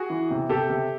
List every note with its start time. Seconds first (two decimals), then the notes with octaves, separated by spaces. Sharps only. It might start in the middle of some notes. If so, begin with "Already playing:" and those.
Already playing: F#4 G#4
0.10 E3
0.31 C3
0.49 C3 G4 A4
0.70 C3